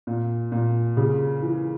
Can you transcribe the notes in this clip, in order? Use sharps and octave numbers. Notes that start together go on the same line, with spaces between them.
A#2
A#2
C#3
E3